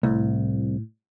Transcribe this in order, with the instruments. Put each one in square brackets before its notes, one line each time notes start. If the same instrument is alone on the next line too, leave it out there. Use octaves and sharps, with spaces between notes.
[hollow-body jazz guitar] C2 [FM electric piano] A2